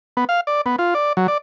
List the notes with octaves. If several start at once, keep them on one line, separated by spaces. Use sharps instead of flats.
B3
F5
D5
B3
F4
D5
F#3
D5